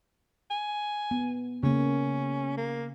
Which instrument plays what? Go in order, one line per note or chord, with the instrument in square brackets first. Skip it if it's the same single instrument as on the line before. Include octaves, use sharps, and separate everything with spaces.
[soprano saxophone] G#5
[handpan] B3
[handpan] C#3 A#3 [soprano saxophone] C#4
[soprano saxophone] A#3